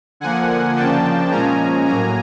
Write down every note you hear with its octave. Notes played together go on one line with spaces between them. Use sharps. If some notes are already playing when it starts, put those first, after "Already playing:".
D3 F3 A#3 F#5 G#5
C#3 F3 A#3 D4 G5 A5
A#2 F3 G#3 C#4 G#5 A#5
A2 F#3 A#3 G#5 A#5